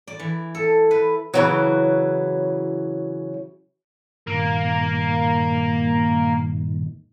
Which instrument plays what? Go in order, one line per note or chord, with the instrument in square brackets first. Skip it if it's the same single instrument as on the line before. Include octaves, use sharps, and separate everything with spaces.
[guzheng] D5
E3
A4
B4
[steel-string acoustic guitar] C#3 E3 F#3
[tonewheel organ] G2 A#2 D#3 [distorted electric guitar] A#3